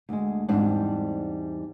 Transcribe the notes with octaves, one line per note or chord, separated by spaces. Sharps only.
D2 G#3
E2 G#2 G3 C4 D4